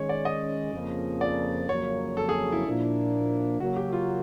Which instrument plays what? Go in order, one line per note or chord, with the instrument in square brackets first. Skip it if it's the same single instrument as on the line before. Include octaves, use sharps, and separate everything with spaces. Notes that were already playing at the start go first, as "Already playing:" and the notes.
Already playing: [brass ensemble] D#3 G#3 C#4 [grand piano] C#5
[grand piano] D5
D#5
[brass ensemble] F2 C#3 F3 A#3
[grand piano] D5
[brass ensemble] F2 C#3 F#3 A#3 [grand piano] C#5
[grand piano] A4
G#4
E4
[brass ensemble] A#2 F3 A#3 D4
[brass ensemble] C#3 F#3 A#3 [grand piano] F#4
[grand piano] G4
F4